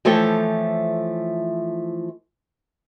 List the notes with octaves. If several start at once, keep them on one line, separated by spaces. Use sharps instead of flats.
E3 F3 A3 C#5 G5